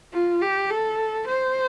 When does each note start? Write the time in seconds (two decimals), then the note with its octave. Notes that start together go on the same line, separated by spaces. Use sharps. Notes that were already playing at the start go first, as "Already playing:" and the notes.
0.13 F4
0.42 G4
0.70 A4
1.27 C5